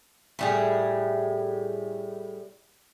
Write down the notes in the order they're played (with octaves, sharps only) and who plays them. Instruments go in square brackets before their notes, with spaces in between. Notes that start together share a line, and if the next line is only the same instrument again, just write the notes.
[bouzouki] A2 G3 G#4